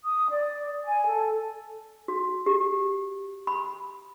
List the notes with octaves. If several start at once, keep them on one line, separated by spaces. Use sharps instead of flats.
D#6
D5
G#5
A4
F#4
G4
B5